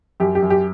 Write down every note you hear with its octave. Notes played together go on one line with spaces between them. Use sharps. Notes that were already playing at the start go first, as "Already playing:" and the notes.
F#2 G4
G4
F#2
G4